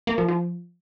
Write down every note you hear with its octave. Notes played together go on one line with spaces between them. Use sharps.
A#3
F3
F3